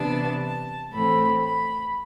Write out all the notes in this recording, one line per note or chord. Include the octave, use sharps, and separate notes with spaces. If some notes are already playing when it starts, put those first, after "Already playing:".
Already playing: C3 E3 B3 D4 A5
A5
A2 E3 A3 C4 B5
B5